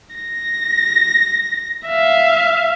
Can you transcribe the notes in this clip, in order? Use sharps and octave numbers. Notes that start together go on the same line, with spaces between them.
A#6
E5 F5